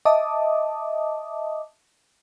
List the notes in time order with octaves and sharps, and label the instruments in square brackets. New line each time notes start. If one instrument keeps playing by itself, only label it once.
[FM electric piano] D#5 E5 A5 D6 D#6